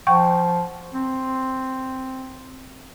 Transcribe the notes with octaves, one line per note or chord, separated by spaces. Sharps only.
F3 F#5 G5 C#6
C4